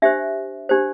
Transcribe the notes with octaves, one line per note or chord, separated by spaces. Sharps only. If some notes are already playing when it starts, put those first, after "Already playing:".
D4 G4 C5 E5
D4 G4 C5